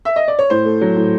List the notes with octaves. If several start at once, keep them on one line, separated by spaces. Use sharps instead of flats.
E5
D#5
D5
C#5
A2 C5
A3
F#3
A2